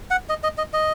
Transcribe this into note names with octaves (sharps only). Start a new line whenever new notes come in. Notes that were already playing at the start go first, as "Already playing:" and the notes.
F#5
D#5
D#5
D#5
D#5